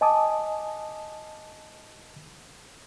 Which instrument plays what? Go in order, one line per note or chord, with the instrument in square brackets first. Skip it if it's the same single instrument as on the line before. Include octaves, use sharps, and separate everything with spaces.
[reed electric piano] D#5 G#5 A5 D6 D#6